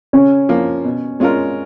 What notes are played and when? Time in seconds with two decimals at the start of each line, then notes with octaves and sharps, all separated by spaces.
0.13 C#3 C#4
0.49 F3 A#3
0.85 B2
1.20 G#3 C#4 F4 A#4